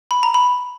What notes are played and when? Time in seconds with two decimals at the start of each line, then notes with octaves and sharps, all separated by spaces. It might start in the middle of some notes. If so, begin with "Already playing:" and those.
0.11 B5
0.23 A#5
0.34 B5